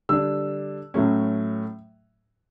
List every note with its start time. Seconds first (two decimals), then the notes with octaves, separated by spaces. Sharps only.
0.09 D3 G3 D4 E6
0.94 A2 F#3 A3 C#4